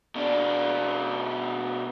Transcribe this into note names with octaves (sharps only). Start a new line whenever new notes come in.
B2 D4